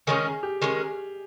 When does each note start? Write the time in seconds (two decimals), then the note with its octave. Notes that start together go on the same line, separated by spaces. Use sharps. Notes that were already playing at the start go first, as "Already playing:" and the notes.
0.07 D#3 G#3 C#4 G#4
0.25 G#4
0.43 G4
0.61 D#3 G#3 C#4 G#4